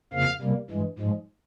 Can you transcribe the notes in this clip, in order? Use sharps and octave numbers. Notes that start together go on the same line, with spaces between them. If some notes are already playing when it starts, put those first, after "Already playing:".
F2 C#3 F3 A#3 F5
C3 G3 A#3
G2 E3 G#3
G#2 F3 G#3